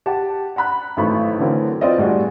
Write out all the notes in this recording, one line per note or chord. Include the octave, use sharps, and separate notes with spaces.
G4 F#5 A5
F#5 A#5 B5 F#6
G#1 E3 F#3 A3 B5 C#6
D3 E3 F#3 A3 C4 A#4
C4 F4 B4 D5 D#5
A2 G3 D4 F4 F#4 G#4